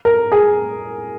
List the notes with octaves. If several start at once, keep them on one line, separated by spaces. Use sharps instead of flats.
A#4
G#4